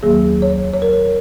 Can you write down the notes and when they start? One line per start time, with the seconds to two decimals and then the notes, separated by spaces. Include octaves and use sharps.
0.03 D#2 D#3 F#3 A#3 G#4
0.42 C#5
0.74 C#5
0.82 A#4